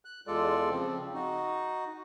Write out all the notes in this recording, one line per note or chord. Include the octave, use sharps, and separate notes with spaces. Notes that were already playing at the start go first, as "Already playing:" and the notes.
F#6
E2 G#3 F4 A4 D5
C#3 F3 C4
D#4 F#4